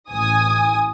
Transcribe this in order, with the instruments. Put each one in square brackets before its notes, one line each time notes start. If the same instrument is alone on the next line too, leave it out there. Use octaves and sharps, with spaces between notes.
[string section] A1 G#5 D#6